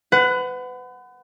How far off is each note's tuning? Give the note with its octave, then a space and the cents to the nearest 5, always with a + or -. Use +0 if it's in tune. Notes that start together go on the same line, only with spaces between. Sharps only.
B4 +35 F#5 +0